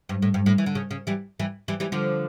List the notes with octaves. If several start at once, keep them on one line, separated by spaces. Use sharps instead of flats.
G2
A2
G2
A2
E3
D3
C#3
C#3
E3 G3
E3 G3
E3 G3
E3 G3
D3 F3